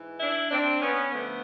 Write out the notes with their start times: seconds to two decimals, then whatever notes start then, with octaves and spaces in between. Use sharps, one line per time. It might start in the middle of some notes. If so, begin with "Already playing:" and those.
Already playing: G#2 E3
0.20 D4 E4
0.51 C4 D4
0.81 B3 C#4
1.12 D3 F3 A3 B3